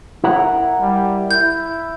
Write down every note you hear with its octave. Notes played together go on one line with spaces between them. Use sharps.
E4 A#4 F#5
G3
E4 G6